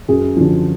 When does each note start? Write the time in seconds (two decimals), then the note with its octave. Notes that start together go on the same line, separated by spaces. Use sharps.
0.08 F#2 G#4
0.36 D3 F3